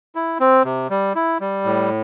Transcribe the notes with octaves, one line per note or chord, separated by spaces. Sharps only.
E4
C4
C3
G3
E4
G3
A2